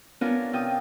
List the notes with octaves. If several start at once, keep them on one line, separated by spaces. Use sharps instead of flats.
B3 C#4 D4 F4 A#4 C#5
C3 F4 G5 D#6